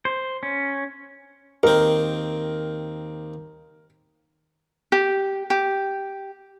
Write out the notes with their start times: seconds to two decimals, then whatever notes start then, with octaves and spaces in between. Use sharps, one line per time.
0.05 C5
0.43 C#4
1.63 D#2 C4 A#4
4.92 G4
5.50 G4